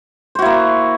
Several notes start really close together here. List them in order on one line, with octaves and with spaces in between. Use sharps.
C5 F#4 E4 A#3